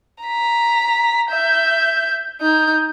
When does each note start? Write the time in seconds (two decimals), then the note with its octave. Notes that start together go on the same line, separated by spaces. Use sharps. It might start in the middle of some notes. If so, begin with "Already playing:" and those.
0.23 A#5 B6
1.30 E5 G6
2.41 D#4 G6